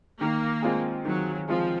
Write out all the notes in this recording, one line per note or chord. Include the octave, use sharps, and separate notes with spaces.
D#3 A#3
G#3 C4 F4 G#4
D#3 F#3
F3 G#3 C4 F4 G#4